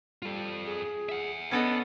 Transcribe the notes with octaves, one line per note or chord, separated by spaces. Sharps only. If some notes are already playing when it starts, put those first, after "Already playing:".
G3 F4 A4
G#4
E5 F#5
B3 C#4 D4 A4 D#5